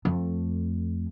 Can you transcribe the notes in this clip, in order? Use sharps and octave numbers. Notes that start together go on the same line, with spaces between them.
F2 A3